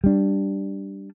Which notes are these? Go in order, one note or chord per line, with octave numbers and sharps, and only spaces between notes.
G3 D4